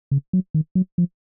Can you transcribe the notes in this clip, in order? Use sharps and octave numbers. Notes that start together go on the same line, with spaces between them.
C#3
F#3
D#3
F#3
F3